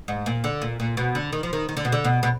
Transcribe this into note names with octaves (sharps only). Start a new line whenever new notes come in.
G#2
A#2
D3
A#2
A#2
B2
D3
D#3
F3
D#3
D#3
D3
B2
D3
B2
B2